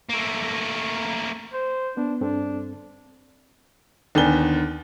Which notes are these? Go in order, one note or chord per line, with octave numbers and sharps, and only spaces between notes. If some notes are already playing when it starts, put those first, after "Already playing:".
A3 A#3
C5
B3 D4
G2 C4 D4 A4
D#2 D3 B3 G#5 G7